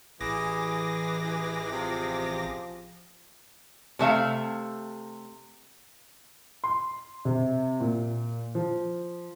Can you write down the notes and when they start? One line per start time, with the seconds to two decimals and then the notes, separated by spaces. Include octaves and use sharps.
0.21 A1 E3 G#4 D6 A#6
1.71 C3 F3
3.99 C3 A3 E5 F5
6.64 C6
7.25 C3
7.80 A#2
8.55 F3